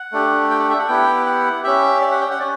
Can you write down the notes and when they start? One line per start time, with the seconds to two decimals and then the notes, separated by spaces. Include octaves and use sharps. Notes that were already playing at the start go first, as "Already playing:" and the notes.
Already playing: F#5
0.12 A3 D4 G4
0.50 G5
0.59 F#5
0.70 E5
0.79 F#5
0.88 B3 E4 G4 G5
1.26 F#5
1.63 C#4 G4 E5
2.01 D5
2.11 F#5
2.21 G5
2.31 F#5
2.40 C#4 D5